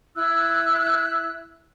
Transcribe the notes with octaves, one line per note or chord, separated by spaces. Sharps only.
E4 E6 F#6